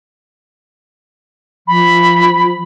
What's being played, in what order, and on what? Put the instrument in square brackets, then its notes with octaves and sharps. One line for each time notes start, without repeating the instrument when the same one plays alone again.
[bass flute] F3 [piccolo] B5